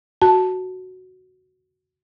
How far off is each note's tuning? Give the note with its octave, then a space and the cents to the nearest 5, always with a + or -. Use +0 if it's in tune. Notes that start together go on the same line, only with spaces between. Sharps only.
F#4 +0 A5 +0